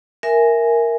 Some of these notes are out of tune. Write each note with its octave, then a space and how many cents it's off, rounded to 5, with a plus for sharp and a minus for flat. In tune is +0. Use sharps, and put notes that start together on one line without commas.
A#4 +0 E5 +0 G#5 +0